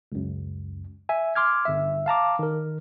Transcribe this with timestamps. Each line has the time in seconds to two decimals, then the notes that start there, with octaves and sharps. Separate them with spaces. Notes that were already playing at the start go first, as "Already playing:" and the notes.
0.12 C#2 F#2
1.09 E5 G#5
1.35 C6 D6 F6 G#6
1.65 G1 E5
2.06 F5 A5 A#5 D6
2.39 D#3 A#4